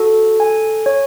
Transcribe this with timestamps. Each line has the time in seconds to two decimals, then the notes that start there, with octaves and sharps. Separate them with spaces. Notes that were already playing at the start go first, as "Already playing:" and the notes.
Already playing: F#4 A4
0.40 G#5
0.86 C#5